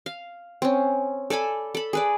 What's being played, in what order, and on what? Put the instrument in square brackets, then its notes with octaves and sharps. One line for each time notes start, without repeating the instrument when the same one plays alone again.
[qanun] F5
C4 C#4
A4 D5 G#5 B5
A4 B5
G#4 B4 D5